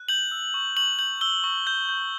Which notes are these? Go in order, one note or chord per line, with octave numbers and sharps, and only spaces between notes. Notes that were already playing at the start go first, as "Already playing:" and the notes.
Already playing: F#6
G6 F#7
E6
C#6
C#6 F#7
G6 F#7
E6 G7
C#6
G6
G6